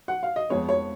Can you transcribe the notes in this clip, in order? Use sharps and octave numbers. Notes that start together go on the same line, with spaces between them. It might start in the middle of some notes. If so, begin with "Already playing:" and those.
F#5
F5
D#5
F2 F3 G#3 B3 C#5
C#5